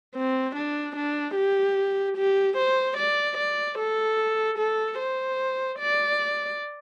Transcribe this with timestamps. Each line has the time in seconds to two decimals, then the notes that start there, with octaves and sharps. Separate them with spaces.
0.15 C4
0.55 D4
0.96 D4
1.36 G4
2.17 G4
2.57 C5
2.97 D5
3.37 D5
3.78 A4
4.58 A4
4.99 C5
5.79 D5